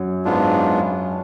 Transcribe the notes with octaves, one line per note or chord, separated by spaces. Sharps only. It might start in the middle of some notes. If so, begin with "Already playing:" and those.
Already playing: F#2
G#2 G#3 B3 D4 F4